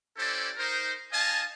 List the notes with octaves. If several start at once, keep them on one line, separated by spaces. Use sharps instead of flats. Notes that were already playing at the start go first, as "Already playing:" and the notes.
C#4 E4 G4 A4 C5 D5
D#4 A#4 C5
D#4 D#5 F5 G#5 A5